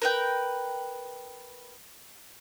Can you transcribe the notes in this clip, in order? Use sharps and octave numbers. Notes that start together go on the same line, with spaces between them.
A#4 B4 G5